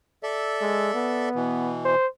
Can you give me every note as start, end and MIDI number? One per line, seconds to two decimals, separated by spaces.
0.23 1.29 69
0.23 1.29 74
0.23 1.29 76
0.61 0.93 56
0.94 1.74 59
1.35 1.95 47
1.35 1.95 52
1.85 2.07 72